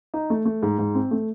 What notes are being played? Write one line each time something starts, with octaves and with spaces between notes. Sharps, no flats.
D#4
A3
A3
G#2
G#2
C4
A3